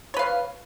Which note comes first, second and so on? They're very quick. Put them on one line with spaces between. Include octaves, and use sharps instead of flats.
C#5 B4 F5